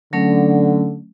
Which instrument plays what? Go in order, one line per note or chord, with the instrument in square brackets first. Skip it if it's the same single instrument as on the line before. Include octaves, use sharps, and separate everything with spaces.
[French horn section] D3 [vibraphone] F#3 A3 C#4